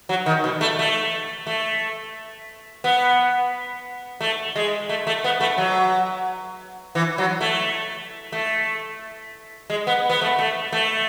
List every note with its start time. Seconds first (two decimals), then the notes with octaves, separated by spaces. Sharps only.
0.09 F#3
0.26 D#3
0.44 B2
0.61 A3
0.79 A3
1.47 A3
2.84 B3
4.21 A3
4.56 G#3
4.89 A3
5.07 A3
5.24 B3
5.41 A3
5.58 F#3
6.95 E3
7.18 F#3
7.41 A3
8.32 A3
9.70 G#3
9.87 B3
10.09 B3
10.22 A3
10.39 A3
10.72 A3